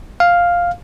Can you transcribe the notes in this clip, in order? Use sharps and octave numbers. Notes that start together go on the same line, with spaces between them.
F5